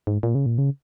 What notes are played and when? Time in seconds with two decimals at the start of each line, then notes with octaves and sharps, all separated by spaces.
0.07 G#2
0.23 A#2
0.35 C#3
0.46 A#2
0.58 C#3